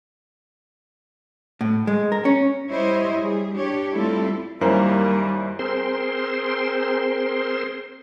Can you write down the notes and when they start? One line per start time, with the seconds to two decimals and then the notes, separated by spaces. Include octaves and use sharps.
1.61 A2
1.87 G#3
2.12 A#4
2.25 C#4
2.70 G3 E4 C5 C#5 D#5
3.21 G3 G#4
3.52 D4 G4 C#5
3.93 G3 A3 C4 E4 F4 A4
4.61 F#2 D#3 G3 A#3 E4 A#4 C5 G#5
5.59 C4 G#4 A#4 C5 C6